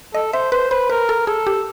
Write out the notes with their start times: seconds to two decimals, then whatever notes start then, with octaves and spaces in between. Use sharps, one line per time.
0.14 A4 D#5
0.33 C5 E5
0.52 B4 C5
0.71 B4 C5
0.90 A#4 B4
1.09 A4
1.27 G#4 A4
1.47 G4